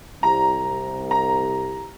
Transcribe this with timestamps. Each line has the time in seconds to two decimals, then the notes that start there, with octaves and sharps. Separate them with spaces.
0.23 C2 A#5
1.11 A#5